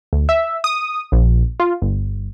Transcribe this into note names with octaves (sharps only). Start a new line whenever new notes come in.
D2
E5
D#6
A#1
F4
G1